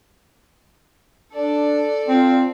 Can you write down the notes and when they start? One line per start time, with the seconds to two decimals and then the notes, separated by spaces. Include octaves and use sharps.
1.33 D4 A4 D5
2.08 C4 F4